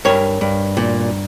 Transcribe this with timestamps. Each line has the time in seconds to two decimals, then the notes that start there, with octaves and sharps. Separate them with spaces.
0.05 G2 A#4 C#5
0.41 G2
0.77 A#2